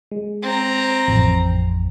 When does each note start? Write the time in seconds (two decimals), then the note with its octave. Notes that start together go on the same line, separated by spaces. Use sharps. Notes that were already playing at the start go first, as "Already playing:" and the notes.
0.11 G#3
0.42 C4 A#5
1.08 A1 F2